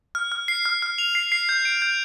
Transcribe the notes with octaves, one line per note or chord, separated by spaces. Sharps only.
F6
F6
C7
F6
F6
F7
C7
C7
G6
D7
G6